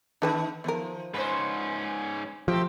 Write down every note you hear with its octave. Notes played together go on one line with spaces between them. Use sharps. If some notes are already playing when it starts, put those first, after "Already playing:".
D#3 B3 D4 B4 A5
D#3 F3 B3 A#4
G#2 C#4 B4 C5
F3 A3 C4 G4